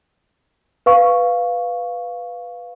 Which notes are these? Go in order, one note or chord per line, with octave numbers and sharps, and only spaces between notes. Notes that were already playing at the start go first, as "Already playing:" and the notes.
B4 F5 C#6